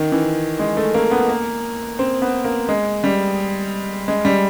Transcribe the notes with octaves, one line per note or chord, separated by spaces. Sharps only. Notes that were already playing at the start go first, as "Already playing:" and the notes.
Already playing: D#3
E3
G#3
A3
A#3
B3
A#3
C4
B3
A#3
G#3
G3
G#3
G3